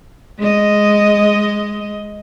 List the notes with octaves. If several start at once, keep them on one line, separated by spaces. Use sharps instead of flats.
G#3 D#5